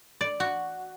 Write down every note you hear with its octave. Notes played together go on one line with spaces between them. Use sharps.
D5
F#4